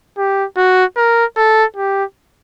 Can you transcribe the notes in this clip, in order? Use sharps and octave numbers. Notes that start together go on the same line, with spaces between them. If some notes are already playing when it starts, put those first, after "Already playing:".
G4
F#4
A#4
A4
G4